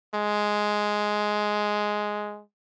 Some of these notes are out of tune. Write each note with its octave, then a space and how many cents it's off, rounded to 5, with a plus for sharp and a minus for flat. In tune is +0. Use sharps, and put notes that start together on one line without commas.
G#3 +5